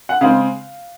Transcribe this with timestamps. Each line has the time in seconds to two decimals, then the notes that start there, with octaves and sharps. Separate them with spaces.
0.09 F#5
0.21 C#3 G#3 C4 F5